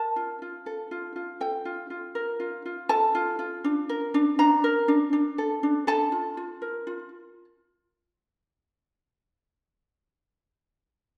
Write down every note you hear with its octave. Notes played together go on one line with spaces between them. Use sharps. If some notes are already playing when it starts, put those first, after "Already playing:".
Already playing: A#4 A5
F4
F4
A4
F4
F4
A4 G5
F4
F4
A#4
F4
F4
A4 A5
F4
F4
D4
A#4
D4
D4 A#5
A#4
D4
D4
A4
D4
A4 A5
F4
F4
A#4
F4